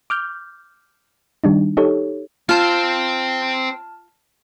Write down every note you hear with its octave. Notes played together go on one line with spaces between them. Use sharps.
D6 F6 G6
D#3 G3 D4 D#4
D#4 G4 A4 C#5
C4 F4 C5 A5 F6